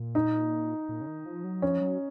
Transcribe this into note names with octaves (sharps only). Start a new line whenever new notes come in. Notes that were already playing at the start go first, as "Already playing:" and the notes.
Already playing: A#2
D#4
A#2
C#3
D#3
F3
F#3
F3 C#4
F#3